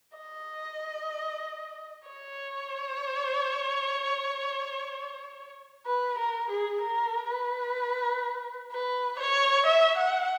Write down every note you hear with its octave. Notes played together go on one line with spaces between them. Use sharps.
D#5
C#5
B4
A#4
G#4
A#4
B4
B4
C#5
E5
F#5